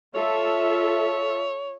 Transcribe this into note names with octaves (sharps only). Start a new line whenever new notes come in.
F4 A4 C#5 E5